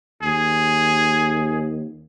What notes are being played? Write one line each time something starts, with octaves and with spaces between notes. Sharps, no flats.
D#2 G#4